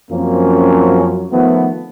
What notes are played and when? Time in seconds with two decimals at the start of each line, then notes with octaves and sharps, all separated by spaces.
0.11 F#2 F3 A#3 C4 C#4
1.32 D#3 F3 A3 B3